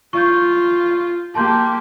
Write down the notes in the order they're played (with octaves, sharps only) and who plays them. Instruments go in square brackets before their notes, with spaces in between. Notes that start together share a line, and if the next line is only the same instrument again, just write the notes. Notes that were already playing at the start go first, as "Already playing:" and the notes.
[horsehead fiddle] F4 [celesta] C#6 G6
[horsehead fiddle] A#3 G4 [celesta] A5 C6 G6